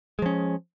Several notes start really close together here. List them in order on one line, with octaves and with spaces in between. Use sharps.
G#3 F3 C#4